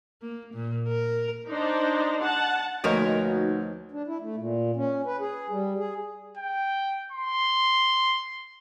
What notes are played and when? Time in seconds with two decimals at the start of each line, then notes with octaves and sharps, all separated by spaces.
0.22 A#3
0.54 A#2
0.88 A#4
1.50 D4 D#4 C5
2.20 F#5 A5
2.84 D2 B2 F3 A#3 D#4 F#4 A#4 C#5
3.91 D4
4.07 E4
4.20 A3
4.36 A#2
4.76 C#4
5.05 B4
5.20 G#4
5.50 G3
5.78 G#4
6.37 G5
7.12 C6